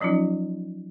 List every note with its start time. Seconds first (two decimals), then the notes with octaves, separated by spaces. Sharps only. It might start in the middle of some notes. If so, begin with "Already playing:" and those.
0.01 F3 F#3 C#4 D#4 F4